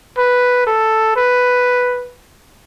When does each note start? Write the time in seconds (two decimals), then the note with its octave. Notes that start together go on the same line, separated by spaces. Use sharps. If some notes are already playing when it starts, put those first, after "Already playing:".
0.17 B4
0.67 A4
1.16 B4